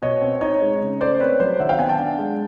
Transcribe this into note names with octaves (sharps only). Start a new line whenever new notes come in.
B2 C#5 D#5
C4
D#4 C#5 D#5
G#3
C#3
A3 C5 D5
C4 B4 C#5
F#3 C5 D5
D#3 E5 F#5
F5 G5
B3 F#5 G#5
G5 A5
D4
G#3